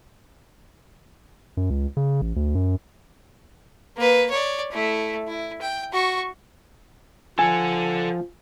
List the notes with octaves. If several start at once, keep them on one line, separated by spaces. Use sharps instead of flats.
F#2
C#2
C#3
A1
D2
F#2
A#3 B4
C#5 D5
A3 E4
E4
G5
F#4 C#6
F3 A4 F#5 G#5